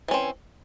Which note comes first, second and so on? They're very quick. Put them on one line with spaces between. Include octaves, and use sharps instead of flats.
E3 C#4 C4